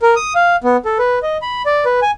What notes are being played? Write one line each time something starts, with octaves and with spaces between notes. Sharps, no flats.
A#4
D#6
F5
B3
A4
B4
D#5
B5
D5
B4
G#5